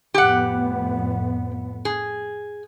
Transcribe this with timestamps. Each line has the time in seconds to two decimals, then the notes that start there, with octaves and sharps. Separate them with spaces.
0.14 F2 A2 B3 G4 F#5
1.85 G#4